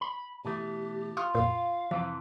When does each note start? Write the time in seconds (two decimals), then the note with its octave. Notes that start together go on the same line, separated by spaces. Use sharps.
0.01 B5
0.45 B2 E3 A3 G4
1.17 F4 C#6 D#6 F6
1.35 F2 A#2 F5
1.91 F2 C3 E3 F3